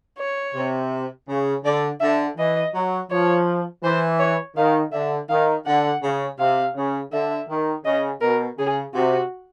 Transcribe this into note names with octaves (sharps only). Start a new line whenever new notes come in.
C#5
C3
C#3
D3 D5
D3 E5
E3 D#5
F#3
F3 C#5
E3 C5
C#5
D#3 F5
D3 E5
D#3 F5
D3 F#5
C#3
C3 F5
C#3
D3 E5
D#3
C#3 D#5
B2 A#4
C#3 G#4
C3 F#4